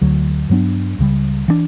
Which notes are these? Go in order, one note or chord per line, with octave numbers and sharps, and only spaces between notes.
D2 D3 F#3
G2 F#3 B3 D4
C#2 C#3 G3
E3 B3 D4